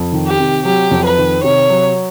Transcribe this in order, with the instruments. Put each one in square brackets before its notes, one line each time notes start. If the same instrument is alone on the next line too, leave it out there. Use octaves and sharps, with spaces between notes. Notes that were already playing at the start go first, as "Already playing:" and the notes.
Already playing: [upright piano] F2
D#3
[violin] G4
[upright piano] C3
[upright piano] F#3 [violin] G4
[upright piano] F2
[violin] B4
[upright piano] D#3
[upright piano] C3 [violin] C#5
[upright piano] F#3